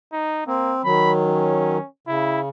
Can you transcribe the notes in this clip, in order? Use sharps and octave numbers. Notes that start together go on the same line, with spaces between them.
D#4
A#3 C4
D#3 F#3 B5
C#4
C#3 E4